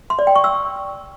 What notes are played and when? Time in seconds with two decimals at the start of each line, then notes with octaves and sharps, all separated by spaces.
0.10 C6
0.19 D5
0.27 G5
0.36 C#6
0.44 E6